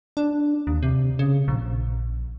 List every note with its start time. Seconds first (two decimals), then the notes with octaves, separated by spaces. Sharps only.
0.17 D4
0.67 D#2
0.83 C3
1.19 C#3
1.48 A#1